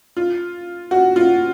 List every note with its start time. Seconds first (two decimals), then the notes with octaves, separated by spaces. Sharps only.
0.17 F4
0.91 F#4
1.16 F4